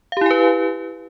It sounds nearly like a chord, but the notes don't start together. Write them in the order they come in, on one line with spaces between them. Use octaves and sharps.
F5 G4 E4 G#5 B4